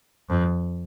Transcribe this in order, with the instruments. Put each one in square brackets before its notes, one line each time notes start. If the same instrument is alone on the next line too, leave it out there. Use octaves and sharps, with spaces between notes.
[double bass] F2